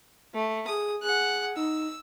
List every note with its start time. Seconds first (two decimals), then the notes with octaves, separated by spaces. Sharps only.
0.34 A3
0.67 G#4 D#6
1.03 G#4 F#5 F#6
1.57 D#4 E6